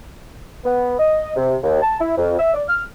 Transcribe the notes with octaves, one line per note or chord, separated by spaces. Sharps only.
B3
D#5
C3
D#2
A5
E4
F2
E5
D5
F6